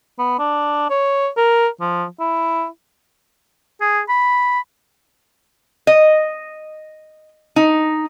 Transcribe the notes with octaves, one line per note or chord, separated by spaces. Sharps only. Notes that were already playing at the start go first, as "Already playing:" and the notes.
B3
D4
C#5
A#4
F3
E4
G#4
B5
D#5
D#4